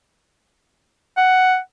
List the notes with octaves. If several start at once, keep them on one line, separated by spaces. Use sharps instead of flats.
F#5